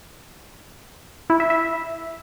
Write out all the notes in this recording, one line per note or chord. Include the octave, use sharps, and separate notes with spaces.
E4
E5
E5